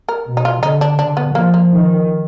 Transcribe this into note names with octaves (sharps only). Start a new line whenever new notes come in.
A#4
B2
D#4
F4
D3 D#4
D4
D3 D4
B3
F3 A#3
A#3
D#3